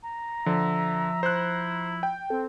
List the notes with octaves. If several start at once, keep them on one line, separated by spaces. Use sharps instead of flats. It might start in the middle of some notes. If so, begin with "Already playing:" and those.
A#5
D3 F3 E5
E4 C5 F#6
G5
C4 A4